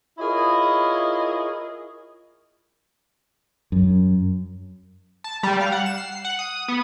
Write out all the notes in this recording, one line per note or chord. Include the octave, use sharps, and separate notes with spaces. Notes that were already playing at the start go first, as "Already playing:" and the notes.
E4 F4 G#4 A#4 C#5 D#5
F#2
A5
G3
F5
F#5
E7
C7
F#5
D#6
B3